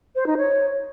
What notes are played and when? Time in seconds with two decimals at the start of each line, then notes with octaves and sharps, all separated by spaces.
0.16 C5
0.27 D#4
0.37 C#5